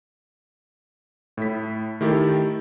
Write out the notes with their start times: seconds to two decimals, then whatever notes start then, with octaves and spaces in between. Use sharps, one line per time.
1.37 A2 E4 B6
2.01 D#3 A3 E4 G4 A4